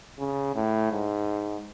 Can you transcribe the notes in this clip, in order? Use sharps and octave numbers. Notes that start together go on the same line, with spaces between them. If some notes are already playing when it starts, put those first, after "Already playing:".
C#3
A2
G#2